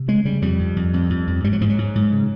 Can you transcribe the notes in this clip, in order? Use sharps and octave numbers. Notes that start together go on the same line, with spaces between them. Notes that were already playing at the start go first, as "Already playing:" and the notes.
Already playing: C3
C#3 G#3
C#3 G3
F2 G3
F2
F2
F2
F2
F2
G#2 G3
F#3
G#2 F3
F#3
G#2
G#2
C#3